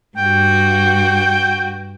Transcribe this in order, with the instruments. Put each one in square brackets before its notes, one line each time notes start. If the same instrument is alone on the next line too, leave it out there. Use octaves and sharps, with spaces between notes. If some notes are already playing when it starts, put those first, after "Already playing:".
[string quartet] G2 F#4 [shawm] G5